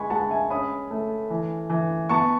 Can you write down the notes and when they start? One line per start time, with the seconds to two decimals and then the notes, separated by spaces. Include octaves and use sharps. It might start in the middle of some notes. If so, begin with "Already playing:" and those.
Already playing: G#3 G#5 B5 C#6
0.10 G#3 F#5 A5
0.30 E5 G#5
0.50 C#4 B5 D#6
0.91 A3
1.30 E3
1.70 E3
2.09 B3 A5 C#6